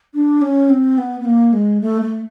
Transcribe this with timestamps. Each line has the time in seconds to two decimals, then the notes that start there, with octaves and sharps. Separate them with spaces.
0.14 D4
0.42 C#4
0.70 C4
0.98 B3
1.21 B3
1.25 A#3
1.53 G#3
1.81 A3
2.02 A3